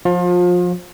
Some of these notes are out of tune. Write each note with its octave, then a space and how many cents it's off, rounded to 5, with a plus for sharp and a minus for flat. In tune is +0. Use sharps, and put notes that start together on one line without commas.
F3 +25 F4 +35